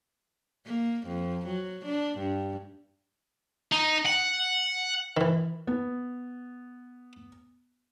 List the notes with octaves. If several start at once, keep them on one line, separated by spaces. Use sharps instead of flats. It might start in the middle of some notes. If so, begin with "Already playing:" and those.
A#3
F2
F#3
D4
G2
D#4
F#5
D#3 E3
B3